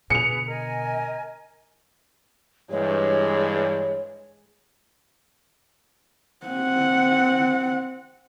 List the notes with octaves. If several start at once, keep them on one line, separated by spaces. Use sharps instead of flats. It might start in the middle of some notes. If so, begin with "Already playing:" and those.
B2 D3 G#4 B4 C#7 F7
A#4 D#5 G#5
G2 E3 G#3 C#5
C4 F#5